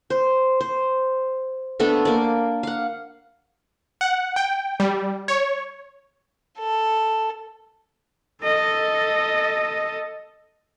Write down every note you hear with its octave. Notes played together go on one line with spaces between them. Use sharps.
C5
C5
A3 B3 D4 A4
A#3 D5
F5 F#5
F#5
G5
G3
C#5
A4
A4 D#5